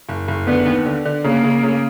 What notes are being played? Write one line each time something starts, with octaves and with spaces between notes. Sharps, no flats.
F#1
F#1
D3 B3
D#2
D3
D3
C#3 A#3
C#3
C#3